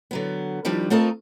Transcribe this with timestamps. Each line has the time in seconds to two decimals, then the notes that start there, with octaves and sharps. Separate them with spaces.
0.11 D3 F#3 B3
0.65 D#3 F3 G3 D4
0.90 A3 C4 F4 A4 A#4 D#5